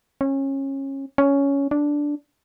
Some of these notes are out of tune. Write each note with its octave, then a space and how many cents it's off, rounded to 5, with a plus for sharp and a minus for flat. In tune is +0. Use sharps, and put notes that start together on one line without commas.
C#4 -25
C#4 +10
D4 -5